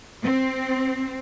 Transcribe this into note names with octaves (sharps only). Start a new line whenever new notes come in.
C4